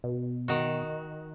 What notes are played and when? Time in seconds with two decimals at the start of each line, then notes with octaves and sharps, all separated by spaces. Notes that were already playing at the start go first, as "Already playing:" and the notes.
0.04 B2
0.48 D#3 F#4